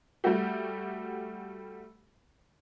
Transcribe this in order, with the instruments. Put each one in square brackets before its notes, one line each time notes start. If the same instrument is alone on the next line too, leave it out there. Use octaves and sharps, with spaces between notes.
[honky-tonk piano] G3 A3 F#4 G4